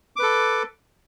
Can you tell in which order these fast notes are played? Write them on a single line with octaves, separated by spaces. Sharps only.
D6 B4 A4